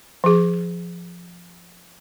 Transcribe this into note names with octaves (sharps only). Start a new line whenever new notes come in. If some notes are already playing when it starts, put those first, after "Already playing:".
F3 G#4